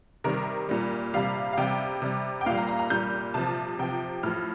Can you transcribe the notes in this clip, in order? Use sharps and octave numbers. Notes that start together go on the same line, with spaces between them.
C3 D#3 G3 A#4
A#2 G3
C3 G3 F5
F5
C3 G3 G5
C3 G3
G5
A#2 G3 F5
A#5
A#5
A#5
A#2 G3 G6
C3 F3 A5
C3 F3 G5
A2 F3 F6